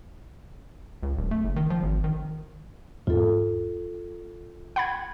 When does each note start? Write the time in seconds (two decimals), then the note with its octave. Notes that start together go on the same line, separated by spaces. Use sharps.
1.03 C#2
1.17 D1
1.31 A3
1.44 F#1
1.56 D#3
1.70 F3
1.83 G#1
2.04 D#3
3.07 E2 G#2 F4 A4
4.76 F#5 B5 G#6